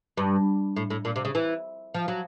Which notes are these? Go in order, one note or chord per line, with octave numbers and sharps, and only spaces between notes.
G2
A2
A2
A#2
C3
C#3
E3
F3
F#3